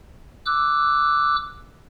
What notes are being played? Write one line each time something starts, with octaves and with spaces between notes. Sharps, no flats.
D6 E6 F#6